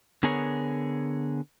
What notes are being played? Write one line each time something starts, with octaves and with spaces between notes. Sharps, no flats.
D3 B3 G#4 A#4 C#5